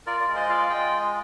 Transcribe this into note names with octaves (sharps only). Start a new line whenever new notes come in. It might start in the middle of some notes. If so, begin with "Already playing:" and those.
F4 A#4 D5
A#4 D5
G#3
C5 D#5
F4 D5 F5
G#3 D#5 G5